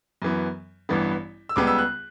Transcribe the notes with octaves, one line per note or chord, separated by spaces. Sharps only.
F#2 E3 B3
A1 G2 E3 B3
E6
C#2 C#3 G3 B3 D6
E6
F#6